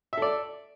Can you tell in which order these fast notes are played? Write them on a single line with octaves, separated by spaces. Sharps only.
E5 A4 D5